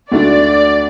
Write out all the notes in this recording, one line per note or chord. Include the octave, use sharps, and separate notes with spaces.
D2 D3 A3 D4 F#4 D5